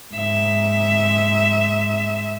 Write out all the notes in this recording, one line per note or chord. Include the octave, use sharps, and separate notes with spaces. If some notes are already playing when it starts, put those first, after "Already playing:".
G#2 E5